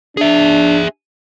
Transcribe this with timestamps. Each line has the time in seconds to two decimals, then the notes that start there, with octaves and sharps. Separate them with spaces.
0.17 D4 G#4 E5